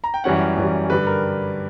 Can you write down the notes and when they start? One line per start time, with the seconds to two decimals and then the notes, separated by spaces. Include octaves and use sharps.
0.04 A#5
0.14 G5
0.24 F#2 E3 G3 C#4 F#5
0.57 F#2 E3 G3 C#4
0.90 G2 D3 G3 B4
1.07 A#4